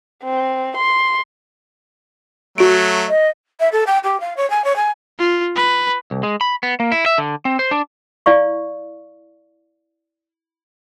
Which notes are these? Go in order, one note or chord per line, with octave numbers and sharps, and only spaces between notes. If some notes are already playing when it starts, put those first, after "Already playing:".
C4
C6
F#3 A3 F#4 D7
D#5
E5
A4
G5
G4
F5
C#5
G#5
C#5
G#5
F4
B4
C2
G#3
B5
B3
A#3
E4
E5
D3
C4
C5
D4
E4 D5 F5 C#6